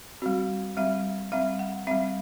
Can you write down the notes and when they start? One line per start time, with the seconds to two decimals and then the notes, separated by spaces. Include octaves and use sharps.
0.22 G3 C4 F#4
0.77 G3 C4 E5
1.32 G3 C4 E5
1.59 F#5
1.87 G3 C4 E5